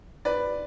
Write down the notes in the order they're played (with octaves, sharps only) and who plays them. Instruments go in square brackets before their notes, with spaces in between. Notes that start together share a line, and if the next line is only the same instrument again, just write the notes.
[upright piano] B4 D5